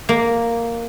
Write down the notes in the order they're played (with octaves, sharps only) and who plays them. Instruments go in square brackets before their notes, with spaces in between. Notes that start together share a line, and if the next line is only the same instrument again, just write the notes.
[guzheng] A#3